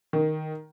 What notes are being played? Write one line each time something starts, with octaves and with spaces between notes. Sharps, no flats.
D#3